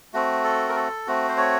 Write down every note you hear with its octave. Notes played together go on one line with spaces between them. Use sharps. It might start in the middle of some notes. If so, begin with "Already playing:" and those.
A3 C4 F#4
A4
A#4
A4
A3 C4 F#4
C5
C#5